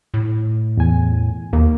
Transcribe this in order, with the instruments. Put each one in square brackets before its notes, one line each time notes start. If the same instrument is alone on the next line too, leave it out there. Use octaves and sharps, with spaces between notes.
[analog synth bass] A2
[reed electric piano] E2 G#5
[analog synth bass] D#2 [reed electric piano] D#3 A#3